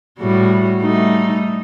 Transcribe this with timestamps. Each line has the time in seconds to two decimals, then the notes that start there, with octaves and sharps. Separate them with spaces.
0.19 A2 G3 F#4
0.82 G3 A3 D#4